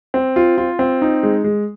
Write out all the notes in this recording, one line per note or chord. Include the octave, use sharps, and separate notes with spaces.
C4
F4
F4
C4
D#4
G#3
G#3